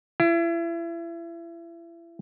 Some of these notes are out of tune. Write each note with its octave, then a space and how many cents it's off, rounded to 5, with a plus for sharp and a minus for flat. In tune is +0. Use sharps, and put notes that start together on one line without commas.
E4 +35